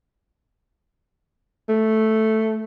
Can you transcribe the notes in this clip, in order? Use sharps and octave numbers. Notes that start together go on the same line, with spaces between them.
A3